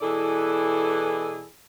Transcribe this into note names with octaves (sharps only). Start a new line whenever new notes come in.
B2 E3 E4 G#4 A4 D5